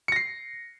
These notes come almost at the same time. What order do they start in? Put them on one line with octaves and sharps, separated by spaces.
C#7 A#6 C7